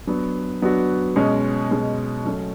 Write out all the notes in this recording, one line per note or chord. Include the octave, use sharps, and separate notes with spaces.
F#3 B3 D4 F#4
F#3 B3 D4 F#4
B2 G#3 C#4
B2 G#3 C#4
F#3 A3 C#4